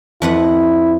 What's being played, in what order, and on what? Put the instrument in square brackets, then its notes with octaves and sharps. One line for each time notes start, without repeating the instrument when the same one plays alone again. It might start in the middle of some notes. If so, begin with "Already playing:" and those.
[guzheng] F2 B4 F#5 [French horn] E4